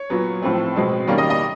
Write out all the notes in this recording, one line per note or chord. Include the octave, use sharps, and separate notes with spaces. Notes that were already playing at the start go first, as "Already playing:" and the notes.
Already playing: C#5
A#2 F#3 B3
A2 F3 A3 C4
B2 G#3 C4
D#3 G3 A#3 C#4 D5
D#5
D#5